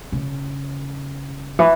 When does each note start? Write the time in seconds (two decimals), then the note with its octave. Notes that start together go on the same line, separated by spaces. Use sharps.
0.12 C#3
1.59 E3